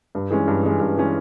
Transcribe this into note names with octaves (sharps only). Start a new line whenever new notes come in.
G2
E3 G#3 C#4
G2
E3 G#3 C#4
G2
E3 G#3 C#4